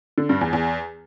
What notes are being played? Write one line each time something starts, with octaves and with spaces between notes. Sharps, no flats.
D3
G2
E2
E2